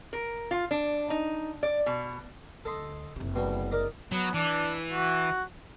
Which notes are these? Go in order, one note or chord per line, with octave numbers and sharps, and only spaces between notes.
A#4
F4
D4
D#4
D5
B2
D2 A4 D#5 C6
F#1 C3
B2 G3
A#4 D5 D#5
F#3 B3
E3 D4
F#4